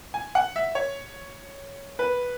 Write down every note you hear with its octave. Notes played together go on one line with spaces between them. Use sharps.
G#5
F#5
E5
C#5
B4